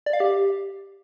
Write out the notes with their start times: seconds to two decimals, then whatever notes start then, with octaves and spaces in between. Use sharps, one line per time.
0.06 D5
0.13 F5
0.20 G4